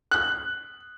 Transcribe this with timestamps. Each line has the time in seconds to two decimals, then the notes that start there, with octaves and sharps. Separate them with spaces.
0.11 F#6